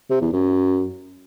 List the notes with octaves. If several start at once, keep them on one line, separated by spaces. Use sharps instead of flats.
C3
E2
F#2